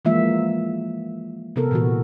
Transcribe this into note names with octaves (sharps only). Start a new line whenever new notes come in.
E3 F3 G#3 A#3 F4 E5
C3 B3 A4 A#4
A#2 E3 F#4